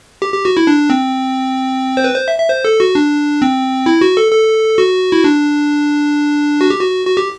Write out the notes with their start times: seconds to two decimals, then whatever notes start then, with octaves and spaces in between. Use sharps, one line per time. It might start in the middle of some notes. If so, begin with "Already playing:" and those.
0.22 G4
0.34 G4
0.45 F#4
0.57 E4
0.67 D4
0.90 C4
1.97 C5
2.04 B4
2.16 C5
2.28 E5
2.38 E5
2.50 C5
2.65 A4
2.80 F#4
2.95 D4
3.42 C4
3.86 E4
4.01 F#4
4.17 A4
4.32 A4
4.78 F#4
5.12 E4
5.24 D4
6.61 F#4
6.70 G4
6.80 F#4
7.07 F#4
7.17 G4